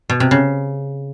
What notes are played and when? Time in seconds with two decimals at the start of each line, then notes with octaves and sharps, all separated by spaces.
0.10 B2
0.20 C3
0.31 C#3